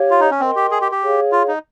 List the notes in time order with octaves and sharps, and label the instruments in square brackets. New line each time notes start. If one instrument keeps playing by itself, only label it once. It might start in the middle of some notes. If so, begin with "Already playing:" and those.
Already playing: [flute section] G4 C#5 F5
[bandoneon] F4
D#4
C#4
[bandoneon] C4 [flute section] A#4 D#5 G5 C6
[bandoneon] G4
G#4
G4
G4
[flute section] G#4 C#5 F5
[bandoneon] F4
D#4